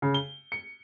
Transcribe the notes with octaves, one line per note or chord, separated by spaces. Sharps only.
C#3
G7
C#7